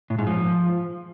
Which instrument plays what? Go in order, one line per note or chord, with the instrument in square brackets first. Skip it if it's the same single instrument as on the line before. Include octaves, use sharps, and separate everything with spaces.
[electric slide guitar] A2
G#2
F3